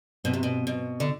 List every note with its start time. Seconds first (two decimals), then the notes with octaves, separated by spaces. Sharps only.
0.24 G2 B2 F#3 C4 F#4
0.33 C3
0.43 B2
0.67 B2
1.00 D3